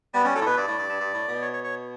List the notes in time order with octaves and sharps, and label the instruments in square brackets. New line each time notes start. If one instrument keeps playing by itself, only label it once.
[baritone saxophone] G3 [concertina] B3
[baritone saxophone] G3 [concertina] C#4
[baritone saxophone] F#3 [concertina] A4
[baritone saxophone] A2
[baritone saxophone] B2 [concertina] B4
[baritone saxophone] G2 [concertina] D5
[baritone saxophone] A2
G2
G2
G2
A2
B2
[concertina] C#5
C#5
C#5